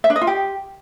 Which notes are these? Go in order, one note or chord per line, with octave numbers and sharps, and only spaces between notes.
E5
D4
D#5
F4
G4